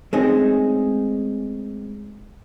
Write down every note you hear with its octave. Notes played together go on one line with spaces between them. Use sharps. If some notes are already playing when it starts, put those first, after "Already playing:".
G#3 A3 C4 C#4 D#4 G#4